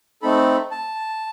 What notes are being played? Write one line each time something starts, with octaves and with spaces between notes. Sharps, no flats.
A3 C4 D#4 A4 B5
A5